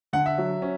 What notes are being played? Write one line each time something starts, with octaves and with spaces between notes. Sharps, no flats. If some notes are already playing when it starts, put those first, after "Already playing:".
D3 F#5
E5
F#3
C#4